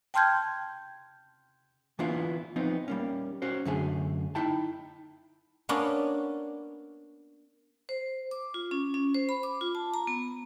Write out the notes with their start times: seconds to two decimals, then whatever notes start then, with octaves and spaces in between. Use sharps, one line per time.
0.14 G5 A5 C6 F6 G6 G#6
1.99 E3 A#3 B3 D4 E4 F4
2.56 F3 B3 C4 D#4
2.88 G3 A#3 C#4
3.42 C#4 F#4 C5
3.65 F#2 D3 A3 G#4
4.35 D#4 E4 G5 A5
5.69 A#3 B3 C#4 D4
7.89 C5
8.31 D6
8.54 F4
8.71 C#4
8.94 C#4
9.15 C5
9.29 B5
9.43 D6
9.61 F4
9.75 A5
9.94 A#5
10.07 B3